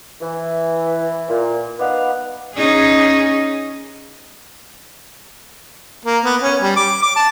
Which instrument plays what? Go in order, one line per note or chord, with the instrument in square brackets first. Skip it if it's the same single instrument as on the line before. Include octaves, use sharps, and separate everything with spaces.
[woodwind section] E3
A#2
B3 D#4 B4 D5 F5 F#5
[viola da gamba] C#4 D#4 G#4
[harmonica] A#3
B3
C#4
G3
D6
D6
A5